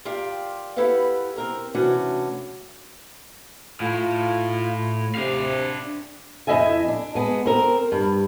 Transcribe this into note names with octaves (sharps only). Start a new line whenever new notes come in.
F4 G4 A#4 D5 F5 G5
E4 G4 A4 B4 F5 F#5
C4 A#4 A#5
C3 E3 A3 C#4 D4 F#4
A2 F4
C3 D4 F5
F2 G3 E4 D#5 E5 G#5
D4
G#3 B3
C4 A#4
G2